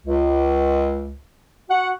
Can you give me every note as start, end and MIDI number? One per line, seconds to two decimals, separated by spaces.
0.06 1.18 37
1.69 1.90 66
1.69 1.90 78